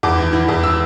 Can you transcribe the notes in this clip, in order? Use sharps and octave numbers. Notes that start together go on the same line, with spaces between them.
E2 D6
E3
E3
E2
E6